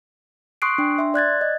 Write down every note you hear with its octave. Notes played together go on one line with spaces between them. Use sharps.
C6 C#6 D#6 F#6 C7 D7
D4 G5
E5 C6
D5 F#6 G#6 A6
D#5